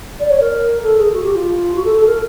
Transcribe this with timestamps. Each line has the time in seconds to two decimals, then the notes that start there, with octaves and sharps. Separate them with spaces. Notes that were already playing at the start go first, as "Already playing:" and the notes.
0.20 D5
0.29 C#5
0.40 A#4
0.82 A4
0.97 G#4
1.12 F#4
1.23 G4
1.34 F4
1.75 F#4
1.85 A4
1.95 A4
2.06 A#4